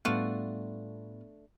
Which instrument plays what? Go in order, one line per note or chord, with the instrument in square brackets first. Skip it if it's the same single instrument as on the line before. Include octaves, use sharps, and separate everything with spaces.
[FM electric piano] A2 G3 B3 [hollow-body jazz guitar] A3 D4 [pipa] F4 F#4